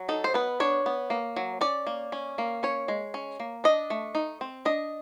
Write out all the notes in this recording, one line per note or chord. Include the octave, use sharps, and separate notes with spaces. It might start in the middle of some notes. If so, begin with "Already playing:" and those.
Already playing: F#3
D#4 A4
C5
B3 B4
D4 C#5
B3
A#3
F#3
C#4 D5
A#3
C#4
A#3
C#4 C#5
G#3
C#4
A#3
D4 D#5
A3
D#4
C4
D4 D#5